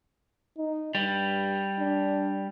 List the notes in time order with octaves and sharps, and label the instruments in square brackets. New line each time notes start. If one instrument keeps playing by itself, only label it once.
[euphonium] D#4
[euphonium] G2 [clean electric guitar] G3
[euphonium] D4